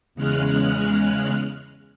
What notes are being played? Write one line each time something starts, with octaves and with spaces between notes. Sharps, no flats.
E2 C#3 G#3 F6 F#6